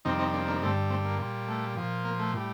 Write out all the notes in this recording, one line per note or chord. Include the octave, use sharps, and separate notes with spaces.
F2 C3 D#3 G3 C4 D#4
C4 D#4
A#3 D4
A#3 D4
G2 D3 G3 A3 C4
A3 C4
A#3
A#2 G3
A3
A#2 F3
A#3
A3
A2 G3